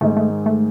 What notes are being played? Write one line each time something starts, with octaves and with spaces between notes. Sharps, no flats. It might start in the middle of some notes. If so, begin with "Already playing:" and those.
G#2 D#3 G#3 A3 D#4
A3
A3